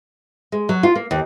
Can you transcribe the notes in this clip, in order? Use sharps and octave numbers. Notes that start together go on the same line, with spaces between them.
G#3
F#3
F4
A#3
D#2